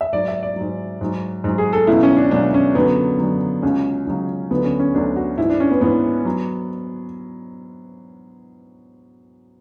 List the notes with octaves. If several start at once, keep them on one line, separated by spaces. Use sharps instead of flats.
E5
G#2 F#3 D5
E5
D5
G#2 F#3
G#2 F#3
G#2 F#3
G#4
A4
C#2 B2 F#3 E4
C#4
D4
C#2 B2 F#3 D4
C#4
F#2 D3 F#3 B3
F#2 D3 F#3
C#2 C#3 F#3 C#4
C#2 C#3 F#3
D2 D3 F#3 B3
C#4
C#4
D2 D3 F#3 D4
F#4
G#2 E3 E4
D4
C#4
B3
G#2 E3 B3
F#3